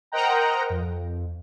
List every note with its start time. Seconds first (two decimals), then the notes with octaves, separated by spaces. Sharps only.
0.12 A#4 C5 D#5 F#5 G5 A#5
0.70 F2